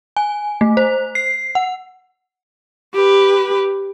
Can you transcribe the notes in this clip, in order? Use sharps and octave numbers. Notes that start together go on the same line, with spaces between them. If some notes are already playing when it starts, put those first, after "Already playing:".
G#5
A3
C5
C7
F#5
G4 B4